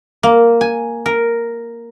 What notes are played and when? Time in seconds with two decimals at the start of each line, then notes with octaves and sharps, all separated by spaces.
0.23 A#3
0.61 G#5
1.06 A#4